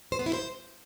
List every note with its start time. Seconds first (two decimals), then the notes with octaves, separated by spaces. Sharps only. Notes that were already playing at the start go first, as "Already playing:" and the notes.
0.12 C5
0.19 B3
0.26 E4
0.33 C5